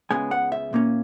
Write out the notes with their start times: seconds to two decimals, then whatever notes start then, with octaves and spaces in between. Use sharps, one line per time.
0.10 C#2 C#3 G#3 B3 G#5
0.31 F#5
0.52 E5
0.73 A#2 A#3 C#4